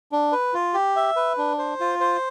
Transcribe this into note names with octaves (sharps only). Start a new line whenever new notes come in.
D4
B4
F4
G4
E5
B4
D4
C5
F4
C5